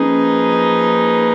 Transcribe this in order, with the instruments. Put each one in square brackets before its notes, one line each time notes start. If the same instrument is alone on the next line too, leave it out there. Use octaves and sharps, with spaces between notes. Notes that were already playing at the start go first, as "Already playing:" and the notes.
Already playing: [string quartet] F3 A#3 D#4 G#4 B4 [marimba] C#4